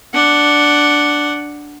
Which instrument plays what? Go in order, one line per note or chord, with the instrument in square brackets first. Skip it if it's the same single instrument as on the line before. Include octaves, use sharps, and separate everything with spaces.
[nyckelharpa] D4 F#5